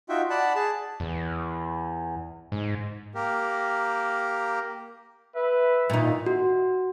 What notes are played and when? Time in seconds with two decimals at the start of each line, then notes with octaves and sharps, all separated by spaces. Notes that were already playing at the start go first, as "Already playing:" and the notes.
0.09 D#4 F4 F#4 E5 G5
0.30 D5 F#5 A5 B5
0.55 G#4 A5
1.00 E2
2.52 G#2
3.15 A#3 G4 A#4
5.35 B4 E5
5.90 A#2 D#3 D#4
6.26 F#4